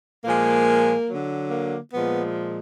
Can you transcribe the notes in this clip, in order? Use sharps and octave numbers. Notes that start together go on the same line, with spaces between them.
A#2 F3 G#3 A#3
D3 F#3
A#3
A#2 F3 G#3 B3